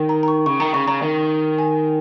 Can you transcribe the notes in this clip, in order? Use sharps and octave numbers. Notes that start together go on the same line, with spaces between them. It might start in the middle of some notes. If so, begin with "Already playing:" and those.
Already playing: D#3
A#5
A#5
C#6
C#3 C#6
D#3 A#5
C#3 C#6
C#3 A#5
D#3
G#5